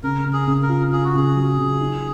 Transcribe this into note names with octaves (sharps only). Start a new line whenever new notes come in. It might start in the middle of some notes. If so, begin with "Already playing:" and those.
C#3 A#4
C#3
G#4
C#3
A#4
F4
F4 G#4
F#4
C#3 G#4
F#3
C#3
D#4